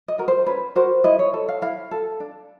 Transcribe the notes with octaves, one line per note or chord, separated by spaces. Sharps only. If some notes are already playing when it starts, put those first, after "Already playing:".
D#5
F#4 A#4
C5
C#4 B4
F#4 A#4 C5
E4 D#5
C#5
A4
F5
E4 F5
A4
D4